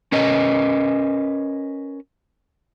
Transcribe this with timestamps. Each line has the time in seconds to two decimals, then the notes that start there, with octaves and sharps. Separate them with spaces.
0.12 C#4 A#4 B4 D#5